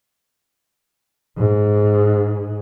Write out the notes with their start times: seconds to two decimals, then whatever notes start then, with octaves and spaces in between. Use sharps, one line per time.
1.38 G#2